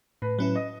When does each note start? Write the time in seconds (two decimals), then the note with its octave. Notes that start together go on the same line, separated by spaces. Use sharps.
0.22 A2 B4
0.39 F#3 C#4 E4 B4
0.56 D#5